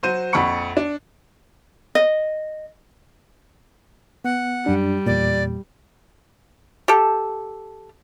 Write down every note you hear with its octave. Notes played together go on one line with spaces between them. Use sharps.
F#3 F#4 C5 D#7
A#1 F2 F#5 B5 C#6 C#7
D4
D#5
B3 F#5
F#2 G3 D4
E2 A#2 D5
G4 A4